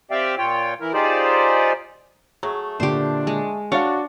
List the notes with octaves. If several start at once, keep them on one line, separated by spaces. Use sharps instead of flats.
C4 G4 D5 E5 F5 G5
A#2 F4 C#5 G5
E3 E4 A#4
D#4 F4 G4 G#4 C5 D5
F#3 A3 G#4
A#2 D3 D4 G4 C5
G#3
D4 F#4 C#5 F5 A6 C#7